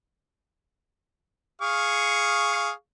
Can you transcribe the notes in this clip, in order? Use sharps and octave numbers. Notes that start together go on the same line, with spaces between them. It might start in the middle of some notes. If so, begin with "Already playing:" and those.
G#4 F5 C#6